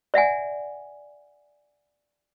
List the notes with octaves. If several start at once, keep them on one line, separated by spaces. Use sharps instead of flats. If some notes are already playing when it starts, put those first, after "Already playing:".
D5 E5 F#5 G#5